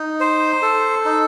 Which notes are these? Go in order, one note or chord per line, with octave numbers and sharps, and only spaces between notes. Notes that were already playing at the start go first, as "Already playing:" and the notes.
Already playing: D#4
C5
A4
D#4